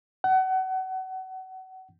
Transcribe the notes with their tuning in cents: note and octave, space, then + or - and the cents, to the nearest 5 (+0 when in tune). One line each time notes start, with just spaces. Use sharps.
F#5 +30